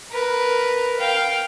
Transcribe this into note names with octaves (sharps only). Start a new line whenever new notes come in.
A#4 B4
F5 G5